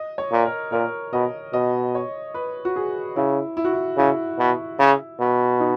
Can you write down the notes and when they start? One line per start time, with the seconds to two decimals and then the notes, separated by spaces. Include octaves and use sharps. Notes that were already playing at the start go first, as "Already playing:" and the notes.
Already playing: D#5
0.18 C#5
0.32 A#2
0.45 A#4
0.72 A#2 A#4
1.13 B2 D#5
1.53 B2 D#5
1.95 C#5
2.34 B4
2.65 F#4
2.76 G#4
3.16 C#3 E4
3.57 E4
3.65 F#4
3.73 E4
3.97 C#3 E4
4.39 B2
4.80 C#3
5.20 B2
5.60 D#4